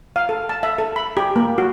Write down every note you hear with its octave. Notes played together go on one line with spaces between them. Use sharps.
F5
A4
A5
E5
A4
B5
G4
A#3
F#4